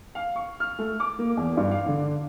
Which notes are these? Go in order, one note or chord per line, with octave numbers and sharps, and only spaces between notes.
F5
C#6
F6
A3
D6
A#3
E2
G2
F5
D3